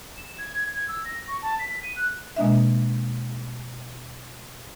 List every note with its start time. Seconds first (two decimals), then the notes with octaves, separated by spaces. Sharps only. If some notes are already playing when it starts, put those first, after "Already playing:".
0.17 E7
0.38 G#6
0.74 G#6
0.88 E6
1.05 A#6
1.27 C#6
1.42 A5
1.59 B6
1.83 D#7
1.96 F#6
2.36 B2 G#3 A#3 D4 D#5 E5